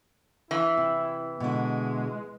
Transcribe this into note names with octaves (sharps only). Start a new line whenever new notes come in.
E3 E4
C3
B2 D3 G#3 E4